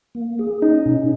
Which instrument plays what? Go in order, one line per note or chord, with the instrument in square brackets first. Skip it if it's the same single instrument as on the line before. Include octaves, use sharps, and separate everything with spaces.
[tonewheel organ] A#3
G#4
[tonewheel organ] C#4 [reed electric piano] D#4
[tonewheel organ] B2